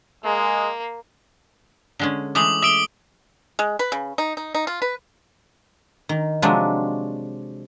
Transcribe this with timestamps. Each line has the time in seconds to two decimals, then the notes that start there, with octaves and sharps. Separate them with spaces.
0.25 G#3 A#3
1.99 D3 G#3 C#4
2.35 E3 G#3 A3 D6 D#6 F#7
2.62 E5 D#6 D7 G7
3.59 G#3
3.79 B4
3.92 C#3
4.18 D#4
4.37 D#4
4.55 D#4
4.67 F4
4.82 B4
6.09 D#3
6.42 C3 F3 F#3 G#3 D4